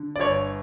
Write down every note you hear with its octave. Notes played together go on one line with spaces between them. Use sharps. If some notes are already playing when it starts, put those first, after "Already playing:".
Already playing: D3
D5
G1 C#5